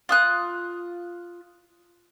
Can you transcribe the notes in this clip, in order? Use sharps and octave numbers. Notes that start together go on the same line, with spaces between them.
F4 D#6 F#6